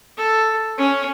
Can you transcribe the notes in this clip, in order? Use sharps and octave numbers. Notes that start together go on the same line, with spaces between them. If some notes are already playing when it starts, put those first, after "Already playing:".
A4
C#4